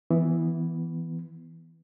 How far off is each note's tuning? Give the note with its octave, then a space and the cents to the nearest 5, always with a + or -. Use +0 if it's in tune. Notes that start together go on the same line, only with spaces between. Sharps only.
E3 +0 B3 +0